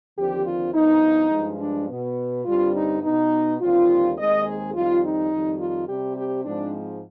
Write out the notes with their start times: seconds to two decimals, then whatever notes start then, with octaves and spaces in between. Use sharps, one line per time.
0.17 D#2 D3 F3 C4 G4
0.45 F4
0.73 G2 F3 B3 D#4
1.31 G2 F3 G#3
1.60 D4
1.88 B2 B3
2.45 G2 D3 G3 C4 F4
2.74 D#4
3.01 B2 B3 D#4
3.59 D#2 D3 G3 C4 F4
4.16 D#2 D#3 G#3 C4 D#5
4.44 G#4
4.73 F2 D#3 G3 C4 F4
5.02 D#4
5.31 F2 D#3 G3
5.60 F4
5.88 C3 G3 C4 G4
6.16 G4
6.45 G#2 F3 G#3 C4 D4